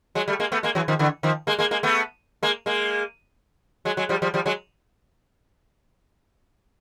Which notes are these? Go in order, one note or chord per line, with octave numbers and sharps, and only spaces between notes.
F#3 G#3
G3 A3
G#3 A#3
A3 B3
G#3 A#3
E3 F#3
D#3 F3
D3 E3
D#3 F3
G#3 A#3
G#3 A#3
G#3 A#3
A3 B3
G#3 A#3
G#3 A#3
F#3 G#3
F#3 G#3
F3 G3
F3 G3
F3 G3
F#3 G#3